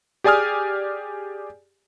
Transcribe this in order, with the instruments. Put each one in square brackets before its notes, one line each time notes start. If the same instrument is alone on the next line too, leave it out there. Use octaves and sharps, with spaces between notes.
[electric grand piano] G4 G#4 D5 G#5 D#6 F6